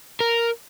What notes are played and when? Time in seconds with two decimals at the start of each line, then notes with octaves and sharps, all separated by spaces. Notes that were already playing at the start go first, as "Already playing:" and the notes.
0.20 A#4